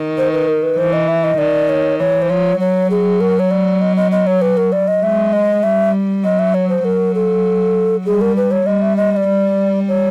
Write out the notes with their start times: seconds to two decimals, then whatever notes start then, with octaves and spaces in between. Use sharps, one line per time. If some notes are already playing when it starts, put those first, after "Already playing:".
Already playing: D#3
0.18 C5
0.32 B4
0.48 A#4
0.63 B4
0.78 E3 C5
0.93 D#5
1.08 E5
1.24 D#5
1.38 D#3 D5
1.69 C#5
1.99 E3 C#5
2.22 C5
2.29 F3 C#5
2.60 F#3 C#5
2.90 G#4
3.21 A#4
3.39 C#5
3.51 D5
3.81 D#5
3.97 D#5
4.12 D#5
4.27 C#5
4.41 B4
4.57 A#4
4.72 D5
4.88 D#5
5.03 G#3 E5
5.33 D#5
5.63 G3 E5
6.24 F#3 D#5
6.39 E5
6.54 C#5
6.69 C5
6.84 F#3 A#4
7.15 A4
8.06 G3 G#4
8.21 A#4
8.36 B4
8.51 C#5
8.66 G3 D#5
8.82 E5
8.97 D#5
9.12 D#5
9.17 D5
9.28 G3
9.88 C#5